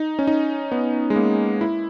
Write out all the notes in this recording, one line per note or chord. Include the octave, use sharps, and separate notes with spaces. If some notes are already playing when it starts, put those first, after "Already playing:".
Already playing: D#4
C#4
D#4
B3
G#3
A#3
E4